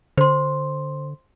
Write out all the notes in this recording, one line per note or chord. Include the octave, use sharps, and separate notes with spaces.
D3 C5 C6